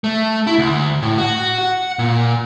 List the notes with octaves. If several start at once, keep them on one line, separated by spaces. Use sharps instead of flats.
A3
E4
D2
A2
F#4
F#5
A#2